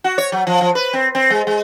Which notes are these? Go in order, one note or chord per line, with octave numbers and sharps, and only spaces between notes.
F#4
C#5
F#3
F3
F3
B4
C4
C4
G#3
G#3